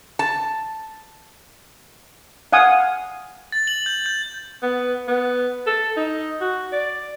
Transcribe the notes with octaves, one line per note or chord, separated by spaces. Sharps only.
A5
F5 F#5 G#5 D#6
A6
F#7
G6
G6
B3
B3
A4
D#4
F#4
D5